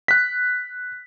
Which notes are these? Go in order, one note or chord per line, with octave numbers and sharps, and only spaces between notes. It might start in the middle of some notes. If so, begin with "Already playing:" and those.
F#6 B6